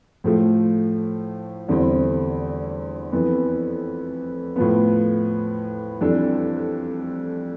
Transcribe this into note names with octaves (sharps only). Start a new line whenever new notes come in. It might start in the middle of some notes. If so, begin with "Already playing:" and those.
A2 F3 A3
E2 D3 G3 C4 E4
F2 E3 B3
A2 F3 B3
F2 E3 G3 D4 A4